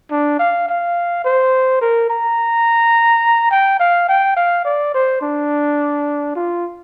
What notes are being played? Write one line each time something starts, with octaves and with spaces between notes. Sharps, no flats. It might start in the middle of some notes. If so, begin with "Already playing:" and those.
D4
F5
F5
C5
A#4
A#5
G5
F5
G5
F5
D5
C5
D4
F4